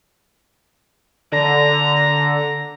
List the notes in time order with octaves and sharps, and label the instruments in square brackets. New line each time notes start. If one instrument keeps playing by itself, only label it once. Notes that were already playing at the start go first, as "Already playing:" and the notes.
[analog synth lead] D3 [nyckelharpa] A#5